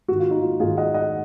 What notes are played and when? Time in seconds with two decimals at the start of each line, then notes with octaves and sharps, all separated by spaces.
0.08 G#2 D#3 F#4
0.20 F4
0.31 D#4
0.41 F4
0.60 G#2 F4 G#4
0.64 D#3
0.77 D#5 F#5
0.94 D#5 F#5